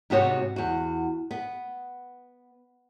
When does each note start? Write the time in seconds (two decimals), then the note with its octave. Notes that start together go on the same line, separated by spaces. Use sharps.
0.10 G#2 C3 B3 F#4 C#5
0.56 E2 F#4
1.31 B3